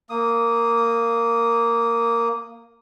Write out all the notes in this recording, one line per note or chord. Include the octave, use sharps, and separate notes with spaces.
A#3 D#6